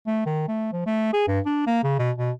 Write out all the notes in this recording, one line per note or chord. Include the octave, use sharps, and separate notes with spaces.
A3
D#3
A3
F3
A3
G#4
G2
D4
A#3
C#3
B2
B2